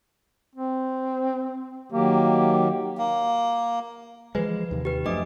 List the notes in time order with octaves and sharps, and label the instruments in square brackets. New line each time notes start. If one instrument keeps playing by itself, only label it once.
[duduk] C4
[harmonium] D#3 F#3 G4 [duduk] A#3
[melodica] A#3
[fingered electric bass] E3 F3 G#3 [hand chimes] B4
[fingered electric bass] D#2 C3
[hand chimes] G4 B4
[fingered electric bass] F#2 F3 A3 [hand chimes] D4 D#5 D6